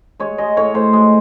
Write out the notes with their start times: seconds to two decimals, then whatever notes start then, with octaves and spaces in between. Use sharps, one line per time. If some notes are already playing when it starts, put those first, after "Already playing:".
0.19 G#3 C#5
0.38 G#3 D#5
0.57 A2 C#5
0.74 A2 C5
0.93 G#3